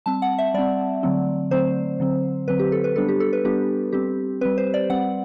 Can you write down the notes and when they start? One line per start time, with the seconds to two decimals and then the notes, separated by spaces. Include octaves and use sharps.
0.06 G3 C4 A5
0.22 F#5
0.38 E5
0.54 G3 C4 D5
1.03 D3 F#3 A3 C4
1.51 D3 F#3 A3 C4 C5
2.00 D3 F#3 C4
2.48 D3 F#3 C4 B4
2.59 G4
2.72 A4
2.84 B4
2.96 G3 B3 D4 A4
3.08 G4
3.20 A4
3.33 B4
3.45 G3 B3 D4 G4
3.93 G3 C4 G4
4.41 G3 C4 B4
4.58 C5
4.74 D5
4.90 G3 C4 F#5